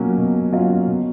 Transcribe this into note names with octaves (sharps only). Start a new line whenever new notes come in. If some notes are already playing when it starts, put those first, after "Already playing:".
Already playing: B2 F#3 A#3 C#4 F4
B2
F#3 A#3 C#4 F4
B2